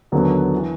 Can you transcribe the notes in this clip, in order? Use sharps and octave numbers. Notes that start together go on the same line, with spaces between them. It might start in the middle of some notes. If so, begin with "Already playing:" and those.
D#2 D3 F#3 B3
E3